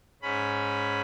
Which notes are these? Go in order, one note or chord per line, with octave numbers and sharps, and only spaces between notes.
G#2 C#4 B5